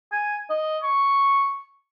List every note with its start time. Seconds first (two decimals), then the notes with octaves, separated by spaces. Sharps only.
0.12 G#5
0.50 D#5
0.83 C#6